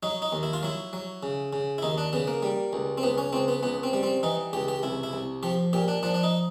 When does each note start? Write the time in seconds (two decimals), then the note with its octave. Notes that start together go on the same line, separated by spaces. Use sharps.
0.03 F#3 D#4
0.22 D#4
0.32 D#2
0.43 E4
0.53 F4
0.63 F#3 E4
0.93 F#3
1.23 C#3
1.53 C#3
1.78 E4
1.82 D#2 D#4
1.98 D4
2.13 C#3 B3
2.27 A#3
2.43 G3
2.73 C#2
2.98 C4
3.03 C#2 B3
3.18 C#4
3.33 C#2 C4
3.48 B3
3.63 C#2 B3
3.83 C4
3.93 G3
4.03 C4
4.23 E3 D#4
4.53 C#2 G4
4.68 G4
4.83 C2 E4
5.03 E4
5.13 C2
5.43 F3 G4
5.73 A#2 G4
5.88 D4
6.03 F3 D4
6.14 D4
6.23 D#4